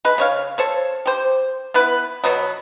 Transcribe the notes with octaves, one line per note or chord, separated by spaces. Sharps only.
G#3 B4
C#3 C#5 F5
A4 C5 C#5
G4 C5
B3 E4 B4
B2 F#3 B3